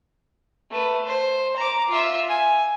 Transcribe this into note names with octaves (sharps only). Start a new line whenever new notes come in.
A3 B4
C5
A#5 D6
F4 E5
G#5